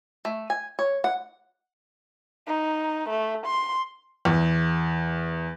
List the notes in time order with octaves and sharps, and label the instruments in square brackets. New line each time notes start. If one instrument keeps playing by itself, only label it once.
[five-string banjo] A3
G#5
C#5
F#5
[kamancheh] D#4
A3
C6
[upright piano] E2